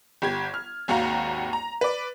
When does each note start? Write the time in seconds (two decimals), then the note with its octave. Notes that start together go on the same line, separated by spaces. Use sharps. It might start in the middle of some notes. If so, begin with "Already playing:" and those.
0.22 G1 G4 G#6
0.54 F6
0.88 G#1 D#2 F#4 F5 A#5
1.53 A#5
1.81 B4 D5